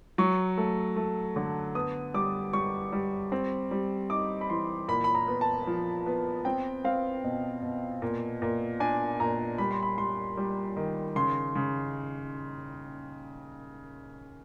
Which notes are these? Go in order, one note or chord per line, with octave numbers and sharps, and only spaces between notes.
F#3 C#6
A3
A3
D3
B3 D#6
G3 D6
G3 C#6
G3
C4
G3
D#4 D6
B5
E3 C6
A#2 B5
B5
A#5
B3
A5
F3
B3
C4 G5
C4 F5
B2
B2
A#2
A#2
D4 G#5
A#2 A#5
G3 B5
C6
B5
G3 C6
G3
D#3
C#3 C6
C#3